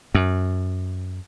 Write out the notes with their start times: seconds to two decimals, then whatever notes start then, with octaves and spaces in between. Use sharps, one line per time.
0.15 F#2